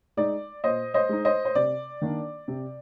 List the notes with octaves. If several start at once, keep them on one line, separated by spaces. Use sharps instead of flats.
G#3 D#4 D5
A#2 C5 D#5
C5 D#5
G#3 D#4
C5 D#5
C5
C3 D5
D#3 A#3 D4
C3